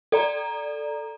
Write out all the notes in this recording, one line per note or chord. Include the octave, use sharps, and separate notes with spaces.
A4 D5 A#5